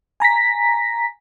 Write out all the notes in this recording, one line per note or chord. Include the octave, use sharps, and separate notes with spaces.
G#5 A#5 A#6 B6